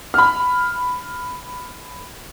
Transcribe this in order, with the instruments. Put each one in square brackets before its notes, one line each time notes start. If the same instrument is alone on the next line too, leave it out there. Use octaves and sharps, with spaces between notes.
[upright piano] B5 F6